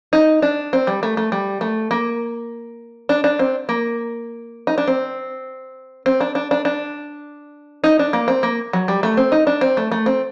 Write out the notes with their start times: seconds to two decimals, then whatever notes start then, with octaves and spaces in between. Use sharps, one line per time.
0.13 D#4
0.42 D4
0.73 C4
0.87 G3
1.03 A3
1.17 A3
1.32 G3
1.61 A3
1.91 A#3
3.09 D4
3.24 D4
3.39 C4
3.69 A#3
4.67 D#4
4.78 D4
4.87 C4
6.06 C4
6.21 D4
6.35 D4
6.51 D4
6.65 D4
7.84 D#4
7.99 D4
8.13 A#3
8.28 C4
8.43 A#3
8.73 F#3
8.88 G3
9.03 A3
9.17 C4
9.32 D#4
9.47 D4
9.61 C4
9.77 A3
9.92 A3
10.06 C4